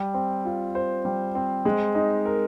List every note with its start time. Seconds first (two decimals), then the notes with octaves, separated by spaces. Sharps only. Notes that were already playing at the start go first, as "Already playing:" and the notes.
Already playing: G3
0.14 C4
0.45 F4
0.75 C5
1.05 G3
1.35 C4
1.65 G#3
1.95 D#4
2.26 A#4